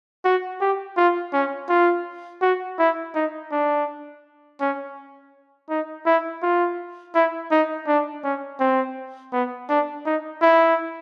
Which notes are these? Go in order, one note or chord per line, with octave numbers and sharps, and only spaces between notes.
F#4
G4
F4
C#4
F4
F#4
E4
D#4
D4
C#4
D#4
E4
F4
E4
D#4
D4
C#4
C4
B3
D4
D#4
E4